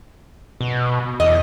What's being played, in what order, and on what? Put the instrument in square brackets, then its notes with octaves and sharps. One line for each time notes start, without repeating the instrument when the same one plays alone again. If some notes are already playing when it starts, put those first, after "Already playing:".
[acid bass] B2
[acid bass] E2 [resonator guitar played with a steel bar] D#5